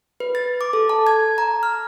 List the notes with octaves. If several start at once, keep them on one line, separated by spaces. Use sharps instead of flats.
B4
A6
D6
A4
A5
G#6
A#5
F6